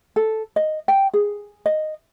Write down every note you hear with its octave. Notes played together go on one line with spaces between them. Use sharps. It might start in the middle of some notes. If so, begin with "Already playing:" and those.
A4
D#5
G5
G#4
D#5